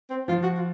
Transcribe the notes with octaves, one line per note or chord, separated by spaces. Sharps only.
C4
F3 F4
F#4
F4